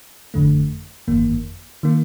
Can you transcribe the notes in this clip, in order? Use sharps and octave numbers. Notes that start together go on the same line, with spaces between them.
G1 F2 D3 A3
G1 F2 D#3 A#3
D#3 A#3